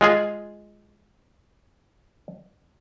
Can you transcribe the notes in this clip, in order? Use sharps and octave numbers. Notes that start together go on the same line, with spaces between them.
G#3 F4 G#4